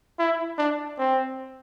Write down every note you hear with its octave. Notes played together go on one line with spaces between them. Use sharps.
E4
D4
C4